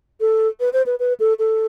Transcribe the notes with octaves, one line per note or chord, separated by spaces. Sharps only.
A4
B4
C5
B4
B4
A4
A4